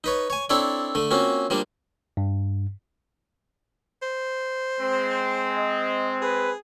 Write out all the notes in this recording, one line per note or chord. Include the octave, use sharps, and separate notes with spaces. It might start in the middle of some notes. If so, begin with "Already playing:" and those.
D#4 B4 C#5
C#5 G#5
C4 D4 E4 A4 C#5 D5
D3 A3
A#3 C4 C#4 F4 F#4
F3 G3 A#3 D4
G2
C5
G#3 C4
D#5
G#4 B4